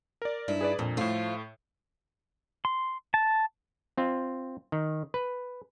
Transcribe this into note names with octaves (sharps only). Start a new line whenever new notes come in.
A#4 D5
G2 D#4 E4
G#4 B4 D5
F2 A#2
A2 F3 A3 F4
C6
A5
C4 F4
D#3
B4